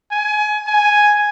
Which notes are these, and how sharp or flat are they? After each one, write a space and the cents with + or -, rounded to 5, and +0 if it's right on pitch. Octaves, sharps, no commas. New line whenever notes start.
G#5 +25
G#5 +0